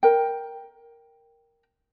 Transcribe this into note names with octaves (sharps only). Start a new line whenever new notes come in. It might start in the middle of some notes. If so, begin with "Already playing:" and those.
A#4 G5